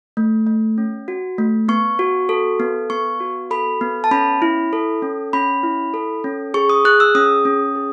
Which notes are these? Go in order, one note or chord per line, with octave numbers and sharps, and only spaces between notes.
A3
A3
C#4
F#4
A3
B3 C#6
F#4
A4
B3
B3 C#6
F#4
A4 B5
B3
A5
C#4 B5
E4
A4
C#4
C#4 B5
E4
A4
C#4
G#4 C#6
D#6
G#4 F#6
E6
C#4 D#6
C#4
G#4